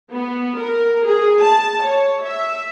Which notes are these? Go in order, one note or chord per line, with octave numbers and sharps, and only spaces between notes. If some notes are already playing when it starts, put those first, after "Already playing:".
B3
A#4
G#4
A5
C#5
E5